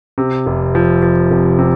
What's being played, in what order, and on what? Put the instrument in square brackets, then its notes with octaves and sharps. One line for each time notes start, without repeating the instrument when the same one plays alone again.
[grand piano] C3
F1
F3
F3
F1
C3